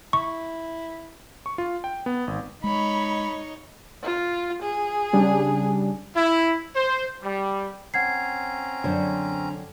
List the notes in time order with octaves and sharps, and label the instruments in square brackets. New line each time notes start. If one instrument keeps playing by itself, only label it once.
[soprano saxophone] E4 [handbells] C#6
[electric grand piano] C#6
F4
G5
B3
G#1
[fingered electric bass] G#3 [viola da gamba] D#4 C#5 [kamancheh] B5
[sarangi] F4
G#4
[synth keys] C#3 G3 D4
[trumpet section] E4
C5
G3
[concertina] C4 C#4 A#5 [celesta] F#5 G#6 C7
[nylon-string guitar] F#2 C5 C#5 [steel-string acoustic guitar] D3